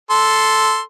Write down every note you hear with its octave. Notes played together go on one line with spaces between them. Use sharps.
A4 C6